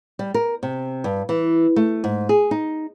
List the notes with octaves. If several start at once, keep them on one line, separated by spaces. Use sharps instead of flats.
G3
A#4
C3
G2
E3
A3
G#2
G#4
D#4